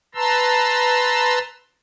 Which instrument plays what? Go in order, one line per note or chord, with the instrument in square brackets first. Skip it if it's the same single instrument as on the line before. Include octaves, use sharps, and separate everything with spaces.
[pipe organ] B4 A5 A#5 C6 E6